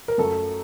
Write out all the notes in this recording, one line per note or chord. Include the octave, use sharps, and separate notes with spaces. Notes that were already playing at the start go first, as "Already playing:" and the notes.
A#4
F#2 F#3 A3 A4